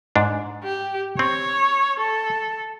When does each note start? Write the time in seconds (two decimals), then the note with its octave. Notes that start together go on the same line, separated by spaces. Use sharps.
0.16 G#2 D4
0.64 G4
1.19 C4 C#5
2.00 A4